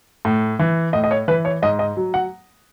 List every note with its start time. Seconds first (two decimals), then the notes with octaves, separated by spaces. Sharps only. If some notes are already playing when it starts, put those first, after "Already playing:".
0.25 A2
0.59 E3
0.93 A2 D#5
1.04 D#5
1.11 C#5
1.28 E3 B4
1.45 C#5
1.62 G#2 D#5
1.79 D#5
1.97 F#3
2.14 F#5